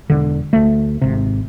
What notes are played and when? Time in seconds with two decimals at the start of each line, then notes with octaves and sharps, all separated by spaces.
0.10 E1 D3
0.53 D2 A3
1.02 G#1 C3